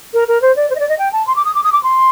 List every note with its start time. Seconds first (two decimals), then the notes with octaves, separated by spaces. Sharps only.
0.14 A#4
0.28 A#4
0.42 C5
0.56 D5
0.70 C5
0.75 D#5
0.79 D5
0.89 D#5
0.98 G5
1.12 A5
1.27 C6
1.36 D6
1.45 D#6
1.54 D6
1.64 D#6
1.72 D6
1.83 C6